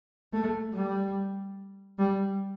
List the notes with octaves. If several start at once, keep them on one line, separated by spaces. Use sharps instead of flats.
A3
G3
G3